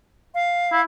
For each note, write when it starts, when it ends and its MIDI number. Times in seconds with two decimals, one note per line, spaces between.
0.34 0.81 77
0.72 0.82 64